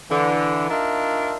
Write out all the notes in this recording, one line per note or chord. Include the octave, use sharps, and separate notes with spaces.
D3 E3
D4 D#4 F4 A#4 E5